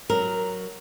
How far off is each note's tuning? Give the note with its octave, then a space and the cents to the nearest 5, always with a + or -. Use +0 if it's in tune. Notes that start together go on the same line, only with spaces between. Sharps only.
F#3 +0 A#4 +0